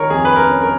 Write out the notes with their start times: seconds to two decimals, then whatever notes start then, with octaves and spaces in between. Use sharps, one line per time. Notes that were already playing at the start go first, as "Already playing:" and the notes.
Already playing: D#3 G#3 A#4 C#5
0.10 F2 G#4
0.25 B4
0.36 A#4
0.49 C#4
0.62 A#4